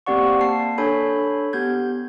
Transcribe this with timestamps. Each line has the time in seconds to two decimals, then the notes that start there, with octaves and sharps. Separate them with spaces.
0.06 A#3 C4 G4 D5 F#5 C#6
0.41 A#3 A5 C7
0.78 D4 A4 C#5 G#5 B5 G6
1.53 B3 G4 G6 G#6